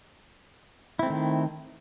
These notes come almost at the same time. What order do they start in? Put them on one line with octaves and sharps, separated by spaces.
E4 C4 A3 D#3